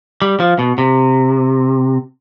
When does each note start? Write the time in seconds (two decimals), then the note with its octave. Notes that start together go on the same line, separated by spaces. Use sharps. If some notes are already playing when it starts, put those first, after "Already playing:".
0.22 G3
0.40 F3
0.59 B2
0.78 C3